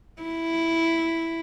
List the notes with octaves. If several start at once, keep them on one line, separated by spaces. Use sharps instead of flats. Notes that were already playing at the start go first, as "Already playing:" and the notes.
E4